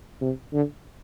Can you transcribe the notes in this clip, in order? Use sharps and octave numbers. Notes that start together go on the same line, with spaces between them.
C3
D3